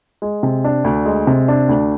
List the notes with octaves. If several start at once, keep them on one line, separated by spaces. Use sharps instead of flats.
G#3
C3
D4
D2
G#3
C3
D4
D2